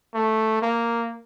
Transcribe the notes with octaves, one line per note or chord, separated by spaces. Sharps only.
A3
A#3